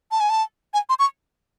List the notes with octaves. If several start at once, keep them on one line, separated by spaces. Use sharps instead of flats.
A5
G#5
A5
G#5
C6
C#6